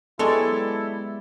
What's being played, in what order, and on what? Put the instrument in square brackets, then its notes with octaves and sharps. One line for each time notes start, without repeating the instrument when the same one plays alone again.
[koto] F#3 G#3 C#5 [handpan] B3 G4 D5 [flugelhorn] E4 [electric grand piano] A4